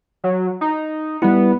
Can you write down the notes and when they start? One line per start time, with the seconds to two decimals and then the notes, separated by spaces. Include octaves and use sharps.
0.24 F#3
0.61 D#4
1.22 G3 B3 E4